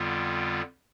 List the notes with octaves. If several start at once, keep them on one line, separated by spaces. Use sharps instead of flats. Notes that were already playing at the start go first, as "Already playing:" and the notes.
Already playing: F2 D3 G3 B3 F4